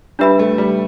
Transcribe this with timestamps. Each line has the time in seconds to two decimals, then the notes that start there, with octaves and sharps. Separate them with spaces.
0.19 G3 D4 G4 B4 E5 B5
0.39 A3
0.58 G3